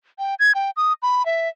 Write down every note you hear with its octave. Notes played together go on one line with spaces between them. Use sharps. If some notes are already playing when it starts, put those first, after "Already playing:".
G5
G#6
G5
D#6
B5
E5